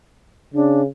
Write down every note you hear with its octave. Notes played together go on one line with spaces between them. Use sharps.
C#3 D4